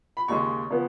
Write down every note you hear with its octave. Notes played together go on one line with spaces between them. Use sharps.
B5
D#2 C#3 G#3 C#6
C#3 F3 B3